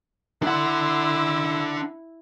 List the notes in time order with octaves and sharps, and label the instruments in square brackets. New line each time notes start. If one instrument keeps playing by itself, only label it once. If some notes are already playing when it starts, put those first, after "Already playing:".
[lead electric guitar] D4 F#5 [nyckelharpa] E4